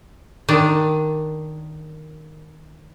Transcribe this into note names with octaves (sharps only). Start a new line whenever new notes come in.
D#3 D4